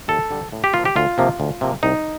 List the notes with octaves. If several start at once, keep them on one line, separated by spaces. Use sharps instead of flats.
D#2 A4
D3 G3
A2
G4
F3 A#3 F4
G4
D2 F4
C3 F3 A#3
D2
C3 F3 A#3
C2 D#4